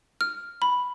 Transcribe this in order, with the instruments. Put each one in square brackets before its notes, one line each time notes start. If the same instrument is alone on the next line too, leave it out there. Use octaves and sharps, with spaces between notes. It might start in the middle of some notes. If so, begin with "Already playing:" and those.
[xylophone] F6
B5